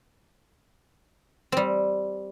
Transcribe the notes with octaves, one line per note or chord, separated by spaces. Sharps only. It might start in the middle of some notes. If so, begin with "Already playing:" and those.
G3 C4